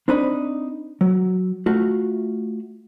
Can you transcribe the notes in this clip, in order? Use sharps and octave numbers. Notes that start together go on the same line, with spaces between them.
C4 D4 D#4 B5
F#3
A3 F4 F#4